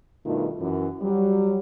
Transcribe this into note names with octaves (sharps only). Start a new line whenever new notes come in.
G2 B2 D#3 A3 D#4 F4
F#2 E3
F#3 G3